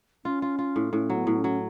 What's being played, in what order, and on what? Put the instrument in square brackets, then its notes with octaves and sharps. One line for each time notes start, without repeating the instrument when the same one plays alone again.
[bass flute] C#4 [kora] F4
[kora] F4
F4
A2
[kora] A2 [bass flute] C#4
[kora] F#3
[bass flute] B3
[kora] A2
[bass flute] C#4
[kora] F#3